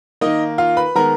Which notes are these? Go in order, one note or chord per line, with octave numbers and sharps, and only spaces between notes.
D#3 A#3 D#4 D#5
F4 F5
B4 B5
D#3 G#3 B3 A#4 A#5